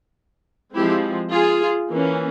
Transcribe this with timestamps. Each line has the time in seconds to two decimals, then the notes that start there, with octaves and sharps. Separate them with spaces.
0.74 F3 G#3 C4 E4 G4
1.31 F4 G#4
1.89 E3 A#3 C#4